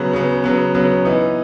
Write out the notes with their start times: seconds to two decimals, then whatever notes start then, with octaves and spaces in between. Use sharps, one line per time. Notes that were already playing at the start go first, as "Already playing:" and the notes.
Already playing: C#3 F#3 B3
0.13 C#3 F#3 B3
0.44 C#3 F#3 B3
0.75 C#3 F#3 B3
1.05 E3 B3 D#4